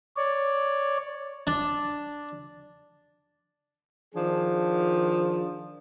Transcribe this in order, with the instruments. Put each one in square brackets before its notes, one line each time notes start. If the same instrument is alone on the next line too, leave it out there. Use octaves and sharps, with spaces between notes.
[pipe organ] C#5 D5
[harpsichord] D4
[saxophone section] D#3 F3 D4 G#4